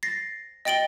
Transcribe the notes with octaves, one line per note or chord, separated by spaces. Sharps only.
A6 A#6 C7
D#5 G5 A6 D7 F#7 G7